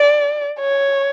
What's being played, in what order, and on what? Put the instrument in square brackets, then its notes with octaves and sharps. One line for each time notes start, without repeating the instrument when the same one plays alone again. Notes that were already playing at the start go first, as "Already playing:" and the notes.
Already playing: [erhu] D5
C#5